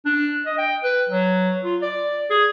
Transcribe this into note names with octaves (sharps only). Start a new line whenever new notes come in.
D4
D#5
G5
B4
F#3
F4
D5
G#4